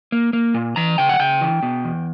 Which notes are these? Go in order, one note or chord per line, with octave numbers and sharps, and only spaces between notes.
A#3
A#3
A#2
E3 A#5
C#3 G5
F#5
C#3 G5
E3
B2
E2